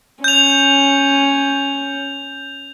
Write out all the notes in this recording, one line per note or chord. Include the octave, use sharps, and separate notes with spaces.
C#4 G6 F7